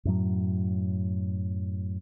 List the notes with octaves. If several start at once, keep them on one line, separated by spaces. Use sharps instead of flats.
F#2 A2 F#3